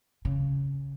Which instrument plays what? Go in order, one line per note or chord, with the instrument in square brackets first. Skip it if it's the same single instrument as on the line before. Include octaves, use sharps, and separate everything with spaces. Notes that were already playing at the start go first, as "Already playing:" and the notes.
[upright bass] C#3